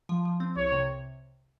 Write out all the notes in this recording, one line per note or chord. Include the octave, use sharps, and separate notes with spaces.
F3
F3
C4
C2 C#5
C3